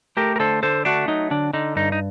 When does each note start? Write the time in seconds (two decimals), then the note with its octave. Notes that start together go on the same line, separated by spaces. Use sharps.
0.17 A3 G4 A#4
0.36 A#4
0.40 D3 A4 C5
0.63 D3 A4 C5
0.85 A3 D4 F#4
1.08 F#3 D#4
1.31 D3 D4
1.53 D3 D#4
1.76 G2 D#4
1.92 D#4